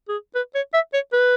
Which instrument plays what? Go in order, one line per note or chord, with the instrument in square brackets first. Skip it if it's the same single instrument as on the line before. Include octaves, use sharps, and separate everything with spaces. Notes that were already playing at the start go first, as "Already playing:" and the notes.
[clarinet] G#4
B4
C#5
E5
C#5
B4